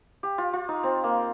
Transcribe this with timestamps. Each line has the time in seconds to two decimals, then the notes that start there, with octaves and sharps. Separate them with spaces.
0.23 G4
0.38 F4
0.53 F4
0.68 D#4
0.83 C4
1.04 A#3